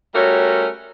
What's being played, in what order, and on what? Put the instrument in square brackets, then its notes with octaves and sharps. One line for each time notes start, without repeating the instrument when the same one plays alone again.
[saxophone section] G3 A3 C#4 F#4 A#4